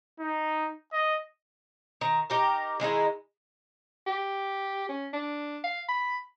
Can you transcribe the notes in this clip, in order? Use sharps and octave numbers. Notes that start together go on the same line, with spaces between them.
D#4
D#5
D#3 A#5
D#4 G4 A#4
D#3 G#3 D#4 E4
G4
C#4
D4
F5
B5